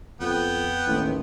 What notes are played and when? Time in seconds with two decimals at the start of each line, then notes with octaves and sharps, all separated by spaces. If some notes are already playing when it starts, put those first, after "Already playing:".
0.21 F2 B3 G5
0.87 A1 D#2